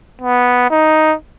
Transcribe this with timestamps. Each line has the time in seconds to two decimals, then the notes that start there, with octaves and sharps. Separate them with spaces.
0.21 B3
0.70 D#4